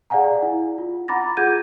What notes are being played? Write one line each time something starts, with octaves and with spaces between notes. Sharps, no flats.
G#4 D5 F5 F#5 G#5 A#5
E4
F4
F#5 A#5 B5 D6 A6 A#6
F4 G#4 F#5 G6 G#6 D#7